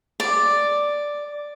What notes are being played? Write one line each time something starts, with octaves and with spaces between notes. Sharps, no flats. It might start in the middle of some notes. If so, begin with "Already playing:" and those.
D5